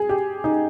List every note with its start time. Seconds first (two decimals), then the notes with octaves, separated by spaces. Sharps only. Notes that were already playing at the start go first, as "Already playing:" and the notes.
Already playing: G#4
0.09 G4
0.44 D#4